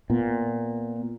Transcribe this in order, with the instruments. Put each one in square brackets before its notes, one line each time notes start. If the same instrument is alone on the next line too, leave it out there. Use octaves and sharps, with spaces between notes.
[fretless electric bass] A#2 [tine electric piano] B3